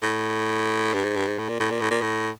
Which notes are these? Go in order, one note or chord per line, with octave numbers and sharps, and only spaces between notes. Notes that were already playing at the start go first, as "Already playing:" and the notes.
A2
G2
G#2
G2
G#2
A2
A#2
A2
A#2
A2
A#2
A2